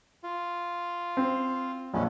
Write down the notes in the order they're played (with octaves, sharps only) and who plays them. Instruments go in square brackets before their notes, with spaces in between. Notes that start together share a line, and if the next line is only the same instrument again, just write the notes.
[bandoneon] F4
[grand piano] C4
[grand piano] A#1 [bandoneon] G#3 B3 C#4